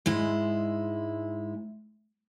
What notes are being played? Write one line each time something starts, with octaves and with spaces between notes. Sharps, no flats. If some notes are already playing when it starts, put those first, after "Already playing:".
G#2 G#3 E4